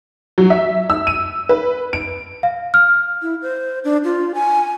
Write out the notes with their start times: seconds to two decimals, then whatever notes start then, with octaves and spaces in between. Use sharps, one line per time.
0.38 F#3
0.50 E5
0.90 E6
1.07 D#7
1.49 B4
1.93 D7
2.43 F5
2.74 F6
3.22 E4
3.42 C5
3.84 D4
4.04 F4
4.35 G#5